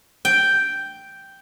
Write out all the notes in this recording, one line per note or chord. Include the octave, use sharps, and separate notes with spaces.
G5